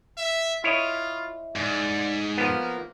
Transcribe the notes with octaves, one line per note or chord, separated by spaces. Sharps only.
E5
E4 F4 C#5 D#5
G#2 D5
F3 A#3 B3